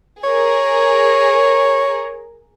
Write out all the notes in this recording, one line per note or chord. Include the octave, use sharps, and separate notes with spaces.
G#4 A#4 C#5